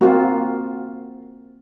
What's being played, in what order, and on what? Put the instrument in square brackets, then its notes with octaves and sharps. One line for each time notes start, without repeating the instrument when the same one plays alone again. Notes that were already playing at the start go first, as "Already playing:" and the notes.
[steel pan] A#3 C4 F4 [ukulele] F#4